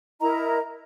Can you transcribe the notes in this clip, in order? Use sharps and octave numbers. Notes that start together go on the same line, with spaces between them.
E4 A#4 D#5 A#5